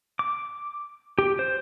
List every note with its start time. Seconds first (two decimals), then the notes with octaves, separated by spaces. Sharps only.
0.19 D6
1.19 G4
1.39 C5